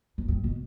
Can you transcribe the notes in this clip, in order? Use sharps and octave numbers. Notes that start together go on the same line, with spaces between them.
E2
G2
B2